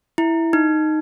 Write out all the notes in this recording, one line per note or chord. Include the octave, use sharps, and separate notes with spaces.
E4
D#4